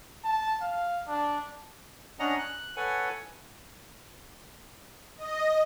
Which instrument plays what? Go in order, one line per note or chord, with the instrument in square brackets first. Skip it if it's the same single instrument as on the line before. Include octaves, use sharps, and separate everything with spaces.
[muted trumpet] A5
F5
D4
[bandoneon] C#4 D4 D#5 F#5 A#5
F#6
A4 B4 C#5 F#5 G#5
[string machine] D#5